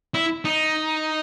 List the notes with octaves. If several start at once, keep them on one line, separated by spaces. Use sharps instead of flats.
E4
D#4